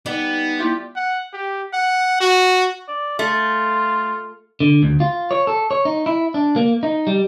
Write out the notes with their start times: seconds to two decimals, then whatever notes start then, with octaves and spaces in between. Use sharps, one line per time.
0.06 G3 B3 D#4
0.59 E4 F4 G4
0.96 F#5
1.34 G4
1.73 F#5
2.20 F#4
2.88 D5
3.19 A3 F4
4.60 D3
4.83 D2
5.00 F4
5.31 C#5
5.47 A4
5.71 C#5
5.85 D#4
6.06 E4
6.34 D4
6.56 A#3
6.83 D#4
7.07 G3